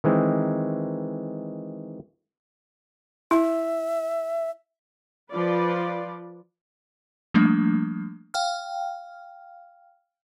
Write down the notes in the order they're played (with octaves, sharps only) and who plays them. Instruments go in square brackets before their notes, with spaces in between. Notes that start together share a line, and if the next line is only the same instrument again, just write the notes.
[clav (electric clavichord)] D#3 E3 G#3 C4
[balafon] E4 [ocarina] E5
[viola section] F3 F4 B4 D5
[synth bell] F3 G3 A3 A#3 D4
F5 G5 F6